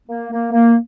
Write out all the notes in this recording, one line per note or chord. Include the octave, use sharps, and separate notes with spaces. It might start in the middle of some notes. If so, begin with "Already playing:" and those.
A#3
A#3
A#3